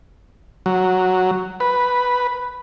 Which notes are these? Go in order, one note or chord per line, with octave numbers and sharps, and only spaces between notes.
F#3
B4